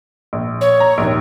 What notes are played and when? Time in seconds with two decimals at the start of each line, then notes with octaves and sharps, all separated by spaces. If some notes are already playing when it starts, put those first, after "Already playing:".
0.33 A#1
0.61 C#5
0.80 A#5
0.98 A#1 D#2